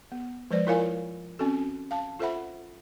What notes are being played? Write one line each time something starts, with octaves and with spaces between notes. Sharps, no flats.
B3
F3 G#3 B4 C5 D5
E4 F4 A#4 C#5 F5 G#5
C4 C#4 F#4 A4
F5 A5
F4 A4 C5 E5 F#5 B5